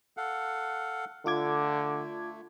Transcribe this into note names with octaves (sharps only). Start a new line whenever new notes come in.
A4 F5 F#5
D3 A3 F4 D6 G#6